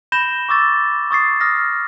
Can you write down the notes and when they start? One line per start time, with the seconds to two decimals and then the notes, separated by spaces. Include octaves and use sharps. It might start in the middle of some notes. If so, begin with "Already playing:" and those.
0.12 B5 G6 A#6 E7 G7
0.49 C#6 D6 E6 A6
1.11 C#6 D#6 A6 C7
1.40 D#6 F6 A#6